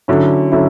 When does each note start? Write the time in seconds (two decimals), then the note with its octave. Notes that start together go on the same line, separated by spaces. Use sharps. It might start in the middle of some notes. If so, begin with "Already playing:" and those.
0.08 D3 F#3 C#4 E4
0.52 D3 F#3 C#4 E4